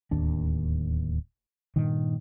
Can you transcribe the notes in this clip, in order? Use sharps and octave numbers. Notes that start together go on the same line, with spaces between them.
D1 D#2 D4
G2 A#2 D#3